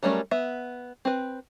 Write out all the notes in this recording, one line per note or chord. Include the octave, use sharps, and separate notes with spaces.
F#3 G3 A3 C#4 A#4
B3 E5
C4 B4